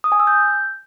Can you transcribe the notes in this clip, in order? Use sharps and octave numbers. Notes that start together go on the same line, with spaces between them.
D#6
G#5
E6
G6